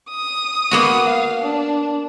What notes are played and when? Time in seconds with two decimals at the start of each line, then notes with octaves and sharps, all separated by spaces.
0.11 D#6
0.71 A#3 B3 F#4
1.07 F5
1.40 D4